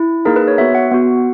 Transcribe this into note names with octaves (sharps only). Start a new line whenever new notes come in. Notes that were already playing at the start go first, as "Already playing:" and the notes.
Already playing: E4
A#3 D#4 G#4 A#4
B4
C#5
B3 F#4 E5
F#5
B3 F#4